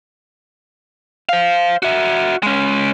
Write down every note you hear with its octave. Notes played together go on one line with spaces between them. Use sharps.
C5 F5
F#4 E5
G#3 C#4